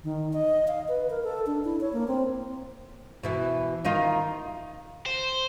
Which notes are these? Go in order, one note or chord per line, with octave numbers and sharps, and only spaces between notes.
D#3
D#5
F5
B4
A#4
A4
D4
E4
C#5
A#3
C4
B2 E3 E4
D#3 D#4 F4
C5